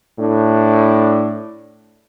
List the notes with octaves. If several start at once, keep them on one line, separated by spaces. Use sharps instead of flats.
A2 D4